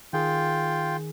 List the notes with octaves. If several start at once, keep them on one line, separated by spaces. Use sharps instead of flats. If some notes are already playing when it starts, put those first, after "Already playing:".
D#3 F4 G#4 G5